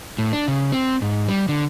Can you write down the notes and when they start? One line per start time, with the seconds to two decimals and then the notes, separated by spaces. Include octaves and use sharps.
0.18 A2
0.33 D4
0.48 C#3
0.72 C4
1.02 G#2
1.29 G3
1.49 D3